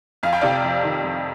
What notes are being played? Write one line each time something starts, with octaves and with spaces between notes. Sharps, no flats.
F2 F5
G5
C3 D5 F5
F2
D#3
F2